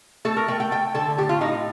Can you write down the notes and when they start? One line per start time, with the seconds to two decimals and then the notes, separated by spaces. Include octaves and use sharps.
0.25 A3 A4
0.37 A#4
0.48 A3 G5
0.60 G5
0.71 A3 G5
0.95 D3 A4
1.18 A2 G4
1.29 F4
1.41 A2 D#4